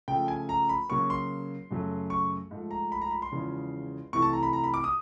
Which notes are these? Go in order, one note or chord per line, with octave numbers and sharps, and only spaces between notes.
C#3 F3 A3 G5
G#5
A#5
B5
C#3 F#3 A#3 C#6
C6
F#2 C#3 F#3 A3
C#6
G#2 F3 A3
A#5
B5
A#5
B5
C6
E2 C#3 F3 G#3
C3 E3 A3 C#6
A5
A#5
B5
A#5
B5
D6
D#6